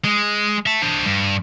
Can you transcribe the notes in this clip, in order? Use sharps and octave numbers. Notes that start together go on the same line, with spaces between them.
G#3
E5 A5
D4 C5
G2